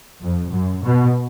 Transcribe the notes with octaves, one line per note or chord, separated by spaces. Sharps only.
F2
F#2
B2